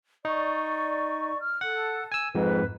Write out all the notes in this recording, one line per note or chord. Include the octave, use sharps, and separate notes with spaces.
D#4 D5 C#6
F6
A4 F#5
G#5 E6
F2 G#2 B4